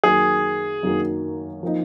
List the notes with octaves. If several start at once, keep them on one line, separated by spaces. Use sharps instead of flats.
F#2 D#3 F#3 A#3 G#4
F#2 D#3 F#3 A#3
F3 A#3 D#4